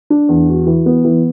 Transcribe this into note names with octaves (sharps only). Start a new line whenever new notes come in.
D4
E2
F#4
E3
B3
E3